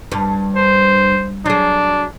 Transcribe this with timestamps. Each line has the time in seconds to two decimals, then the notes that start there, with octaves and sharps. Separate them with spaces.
0.12 G2
0.56 C5
1.46 F#3 D4 G#4